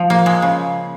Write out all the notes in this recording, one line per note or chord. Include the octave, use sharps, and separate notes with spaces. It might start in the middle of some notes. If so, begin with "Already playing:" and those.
Already playing: F3
A#3
G#3
C#3